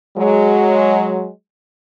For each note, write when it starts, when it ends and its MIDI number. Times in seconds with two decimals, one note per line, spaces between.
0.17 1.28 54
0.17 1.28 56